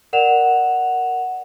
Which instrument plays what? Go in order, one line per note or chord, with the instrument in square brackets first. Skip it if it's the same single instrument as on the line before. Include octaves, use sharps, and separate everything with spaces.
[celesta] A#4 D5 F#5 E7 F7